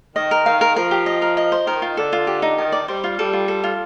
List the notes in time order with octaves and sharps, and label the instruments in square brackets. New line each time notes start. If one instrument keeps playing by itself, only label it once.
[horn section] D#3 [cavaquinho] D#5
[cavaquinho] A#4
[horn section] D#3 [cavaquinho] F5
[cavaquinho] A#4
[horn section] F3 [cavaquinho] A#4
[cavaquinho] G4
D#5
A#4
D#5
C5
[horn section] D#3 [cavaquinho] A#4
[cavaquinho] F4
[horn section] D3 [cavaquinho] A4
[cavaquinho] F4
G4
D#4
[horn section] D#3 [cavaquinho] A5
[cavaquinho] D5
[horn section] G3 [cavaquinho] C5
[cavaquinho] F4
[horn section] G3 [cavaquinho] A4
[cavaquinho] F4
A4
F4